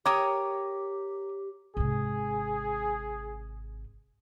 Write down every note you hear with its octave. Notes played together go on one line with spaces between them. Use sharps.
G4 A#4 C#5 G5 D6 D#6
G#1 C3 G#4